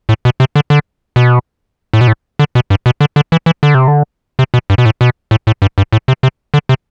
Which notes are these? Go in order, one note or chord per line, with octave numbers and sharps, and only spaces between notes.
A2
B2
C3
D3
D3
B2
A2
B2
A2
D3
B2
G2
B2
D3
D3
E3
E3
D3
C3
D3
C3
B2
G2
B2
A2
B2
A2
A2
G2
G2
A2
C3
C3
D3
C3